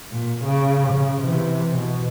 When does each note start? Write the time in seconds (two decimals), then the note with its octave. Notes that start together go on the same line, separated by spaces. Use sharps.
0.11 A#2
0.45 C#3
0.92 C#3
1.22 C3 E3
1.75 B2